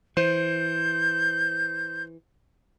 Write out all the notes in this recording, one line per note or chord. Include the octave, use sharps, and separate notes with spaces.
E3 C5 G6